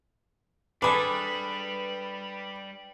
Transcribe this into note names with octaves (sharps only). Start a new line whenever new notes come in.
G3 D4 G#4 A4 B4 B5